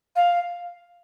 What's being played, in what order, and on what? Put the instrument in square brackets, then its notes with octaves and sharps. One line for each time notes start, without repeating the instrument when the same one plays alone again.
[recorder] F5